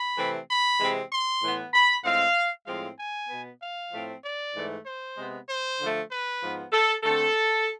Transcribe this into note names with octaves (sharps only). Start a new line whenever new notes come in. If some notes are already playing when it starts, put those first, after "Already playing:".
Already playing: B5
C3 E3 A3 C4
B5
C3 E3 G#3 C4
C6
A2 E3 B3
B5
A2 G#3 C4 F5
A2 F3 G#3 C4 F5
G#5
B2 B3
F5
A2 F3 A3 C4
D5
G#2 E3 A3
C5
C3 G#3 B3
C5
D3 F3 A3
B4
G#2 F3 B3
A4
D3 A3 C4 A4